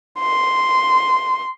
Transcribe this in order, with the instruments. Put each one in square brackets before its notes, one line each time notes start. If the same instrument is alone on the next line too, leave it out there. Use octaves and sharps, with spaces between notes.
[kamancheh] C6